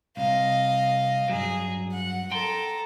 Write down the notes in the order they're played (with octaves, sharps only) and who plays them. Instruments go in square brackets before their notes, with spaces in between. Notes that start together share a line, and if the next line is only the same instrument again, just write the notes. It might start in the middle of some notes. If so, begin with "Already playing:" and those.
[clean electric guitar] C2 [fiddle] D#5 F5
[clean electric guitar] G2 F#3 [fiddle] G#4
[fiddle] F#5
[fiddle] A4 A#5 [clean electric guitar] G5 C6